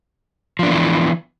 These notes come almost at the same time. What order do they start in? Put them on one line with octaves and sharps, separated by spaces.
F3 D4 B3 E3